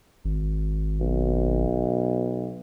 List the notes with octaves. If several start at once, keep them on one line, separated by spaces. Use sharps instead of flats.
G#1
B1